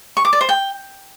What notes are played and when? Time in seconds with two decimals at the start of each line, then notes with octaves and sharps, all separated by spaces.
0.17 C#6
0.25 D6
0.33 D5
0.41 C5
0.49 G5